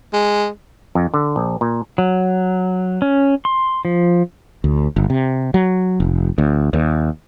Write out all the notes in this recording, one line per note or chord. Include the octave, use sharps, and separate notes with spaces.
G#3
F2
D3
A#1
A#2
F#3
C#4
C6
F3
D2
G1
C3
F#3
F1
D2
D#2